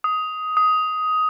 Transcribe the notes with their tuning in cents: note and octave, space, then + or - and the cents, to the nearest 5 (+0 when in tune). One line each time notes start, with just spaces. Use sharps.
D#6 +10
D#6 +10